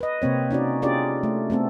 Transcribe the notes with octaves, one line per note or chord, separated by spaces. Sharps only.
B4 D#5
C3 A#3 C4 C#5
C#4 D#4 F#4 D5
C#4 D4 F4 G4 G#4 D5
A3
A3 B3 C4 A4